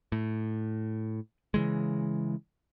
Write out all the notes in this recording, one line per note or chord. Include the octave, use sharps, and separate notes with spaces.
A2
C#3 E3 G#3